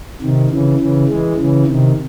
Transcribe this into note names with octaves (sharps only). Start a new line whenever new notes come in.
C3 D#3
C#3 E3
C#3 E3
E3 G#3
C#3 E3
C3 D#3